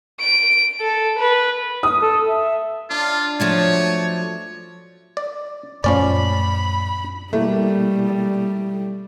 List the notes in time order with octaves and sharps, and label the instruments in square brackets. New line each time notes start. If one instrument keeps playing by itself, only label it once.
[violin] D7
A4
B4
[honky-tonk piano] D#6
[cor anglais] A4
E5
[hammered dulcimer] D4 [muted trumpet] F4
[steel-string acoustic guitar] F3 A3 D4 [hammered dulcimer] F#3 [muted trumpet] C#5
[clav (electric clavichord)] D5
[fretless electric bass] F#2 A#2 A3 [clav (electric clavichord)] F3 C#4 D5 [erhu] B5
[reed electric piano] B2 A#3 E4 [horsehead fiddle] G3 [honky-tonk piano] A3